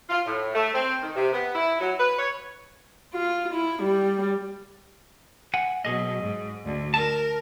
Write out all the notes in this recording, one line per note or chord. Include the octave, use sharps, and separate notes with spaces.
F4
A2
A3
C4
D#3
C3
B3
E4
F#3
B4
C#5
F4
E4
G3
F#5 G#5
B2 F#3 G#4 D#5
G#2
D2
A#4 A5